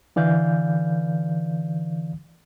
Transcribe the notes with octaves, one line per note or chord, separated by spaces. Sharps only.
D3 E3 D5 F5 G6